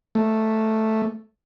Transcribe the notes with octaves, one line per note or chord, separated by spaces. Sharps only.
A3